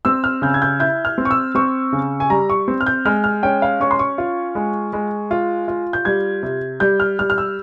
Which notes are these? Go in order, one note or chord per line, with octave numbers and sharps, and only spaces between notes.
C4 E6
F6
C#3 G6
G#6
G6
E4 G6
F6
C4
C#6
E6
C4 C#6
C#3
G#5
G3 A#5
C#6
C4
F6
G6
G#3 F6
F6
C#4 G5
F5
C#4 C#6
C6
C#6
F4
G#3
G#3
F4
F4
G6
G3 G#6
C3
G3 G6
F6
G3 F6
F6
E6